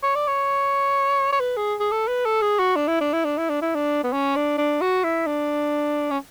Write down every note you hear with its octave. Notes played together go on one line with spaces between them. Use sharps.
C#5
D5
C#5
C#5
B4
G#4
G#4
A4
B4
A4
G#4
F#4
D4
E4
D4
E4
D4
E4
D4
E4
D4
B3
C#4
D4
D4
F#4
E4
D4
C#4